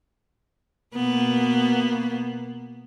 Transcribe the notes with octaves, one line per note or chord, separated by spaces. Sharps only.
B2 A#3 B3